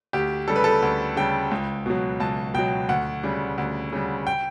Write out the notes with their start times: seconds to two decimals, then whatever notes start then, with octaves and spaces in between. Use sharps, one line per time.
0.13 D2 G4
0.48 C#3 G3 A4
0.56 B4
0.64 A4
0.82 D2
1.17 C#3 G3 G5
1.51 C#2
1.86 B2 F#3
2.20 C#2 A5
2.54 B2 F#3 G5
2.89 D2 F#5
3.23 C#3 G3
3.58 D2
3.93 C#3 G3
4.27 G5